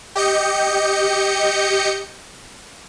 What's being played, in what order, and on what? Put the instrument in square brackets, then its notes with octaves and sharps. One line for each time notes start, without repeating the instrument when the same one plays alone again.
[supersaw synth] G4 D#5 G6 C#7